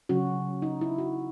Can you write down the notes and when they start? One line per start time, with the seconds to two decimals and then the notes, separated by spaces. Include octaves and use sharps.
0.09 C#3 F#3 C#4 F#4
0.62 D#4
0.81 E4
0.98 F#4